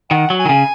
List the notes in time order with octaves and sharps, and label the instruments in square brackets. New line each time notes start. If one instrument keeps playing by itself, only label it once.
[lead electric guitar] D#3 [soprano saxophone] F#5
[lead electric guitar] F#3
[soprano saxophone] G#5
[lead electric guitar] D#3
C#3